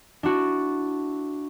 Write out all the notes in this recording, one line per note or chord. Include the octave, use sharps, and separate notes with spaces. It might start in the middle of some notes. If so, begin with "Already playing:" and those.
D4 E4 F#4